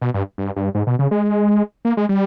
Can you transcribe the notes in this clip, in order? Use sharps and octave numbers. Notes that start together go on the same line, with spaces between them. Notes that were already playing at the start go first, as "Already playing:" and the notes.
B2
G2
G2
G2
G#2
B2
C#3
G#3
A#3
G#3
G3